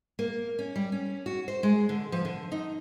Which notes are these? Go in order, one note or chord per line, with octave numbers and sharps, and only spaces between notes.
A#3
C#4
G3
C#4
F#4
C5
G#3
D3
F3
D3
D#4